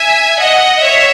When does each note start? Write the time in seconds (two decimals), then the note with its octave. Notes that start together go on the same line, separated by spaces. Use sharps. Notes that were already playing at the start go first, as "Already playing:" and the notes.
Already playing: E5 G#5
0.40 D#5 F#5
0.81 C#5 E5